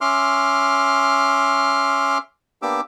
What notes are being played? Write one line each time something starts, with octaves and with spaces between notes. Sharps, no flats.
C#4 E5 C6 D6 F6
A#3 B3 D4 G4 D6 E6